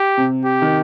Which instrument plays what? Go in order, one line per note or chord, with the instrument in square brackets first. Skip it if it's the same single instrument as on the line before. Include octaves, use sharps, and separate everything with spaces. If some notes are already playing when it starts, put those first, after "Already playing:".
Already playing: [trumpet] G4
[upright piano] C3
[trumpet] G4
[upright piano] D#3